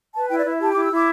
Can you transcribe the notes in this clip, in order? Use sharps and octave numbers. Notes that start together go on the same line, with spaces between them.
B4 A5
E4 G5
D5
E4 E5
G4 A5
E4 D6
E6
E4 D6